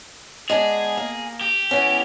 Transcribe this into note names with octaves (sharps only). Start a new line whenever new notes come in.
G#3 B3 D4 G#4
A#3
G4
E3 B3 C#4